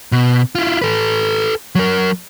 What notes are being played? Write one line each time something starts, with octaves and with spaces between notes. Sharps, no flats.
B2
E4 F4
A4 B4
F#3 A#4